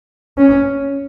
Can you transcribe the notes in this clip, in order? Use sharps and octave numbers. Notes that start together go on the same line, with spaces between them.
C#4